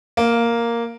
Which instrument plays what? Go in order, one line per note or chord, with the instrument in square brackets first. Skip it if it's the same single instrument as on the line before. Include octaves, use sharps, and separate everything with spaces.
[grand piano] A#3